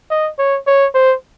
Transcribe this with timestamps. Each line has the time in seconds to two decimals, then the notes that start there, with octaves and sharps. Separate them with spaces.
0.10 D#5
0.39 C#5
0.67 C#5
0.95 C5